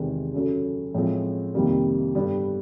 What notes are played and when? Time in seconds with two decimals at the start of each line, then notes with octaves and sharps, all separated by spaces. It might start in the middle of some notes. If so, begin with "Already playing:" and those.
Already playing: E2 C3 D#3 G#3 B3
0.34 F#2 C#3 F#3 A3
0.94 A2 F3 G#3 C4
1.54 F2 C3 D#3 G3 A#3
2.15 G2 D3 G3 B3